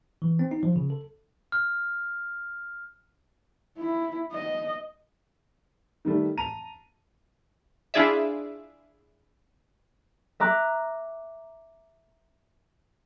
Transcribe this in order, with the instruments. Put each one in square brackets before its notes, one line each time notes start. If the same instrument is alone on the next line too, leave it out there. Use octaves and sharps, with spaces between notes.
[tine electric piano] E3
C4
D#4
F3
C#3
A4
[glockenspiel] F6
[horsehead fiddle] E4
D#5
[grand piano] D#3 G3 A3
A5 A#5 D#7 F7
[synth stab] D4 E4 F4 G#4 D5 E5
[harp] E5 A#5 D6 F#6